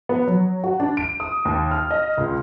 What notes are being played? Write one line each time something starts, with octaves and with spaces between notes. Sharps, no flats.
B3
F#3
F#4
D4
D7
D#6
D#2
F6
D#5
C#2